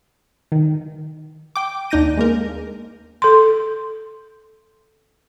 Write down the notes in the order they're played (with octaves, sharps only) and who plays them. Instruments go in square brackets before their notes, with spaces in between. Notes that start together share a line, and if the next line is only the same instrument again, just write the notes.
[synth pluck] D#3
G5 D6
D#2 D4 D#4 G6 A#6 D#7
G#3 A#3 A#4
[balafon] A4 C6